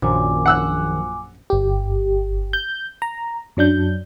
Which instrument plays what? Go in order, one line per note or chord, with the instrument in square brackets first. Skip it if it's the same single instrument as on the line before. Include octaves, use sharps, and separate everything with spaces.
[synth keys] A#1 F#2 F3 [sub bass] D#3 [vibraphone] G#5 D6
[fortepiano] F#5 E6 F#6
[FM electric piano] G1 G4
G6
A#5
F#2 F#3 D4 G6